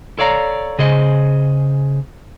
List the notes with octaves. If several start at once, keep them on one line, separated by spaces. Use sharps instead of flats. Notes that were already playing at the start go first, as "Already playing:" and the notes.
A4 C#5 D5 F5 A#5
C#3 G#4 C5 D#5